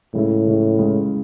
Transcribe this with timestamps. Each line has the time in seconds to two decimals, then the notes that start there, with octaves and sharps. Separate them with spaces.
0.14 C#2 A2 C#3 G#3 C#4 E4
0.46 C#2 C#3 G#3 C#4 E4
0.79 C#2 C#3 G#3 C#4 E4